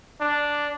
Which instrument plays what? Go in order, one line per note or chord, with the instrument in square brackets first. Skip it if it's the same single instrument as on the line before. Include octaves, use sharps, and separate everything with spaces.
[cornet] D4